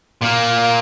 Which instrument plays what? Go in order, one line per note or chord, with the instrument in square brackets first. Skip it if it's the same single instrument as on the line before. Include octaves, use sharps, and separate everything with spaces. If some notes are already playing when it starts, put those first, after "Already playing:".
[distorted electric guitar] A#2 A#3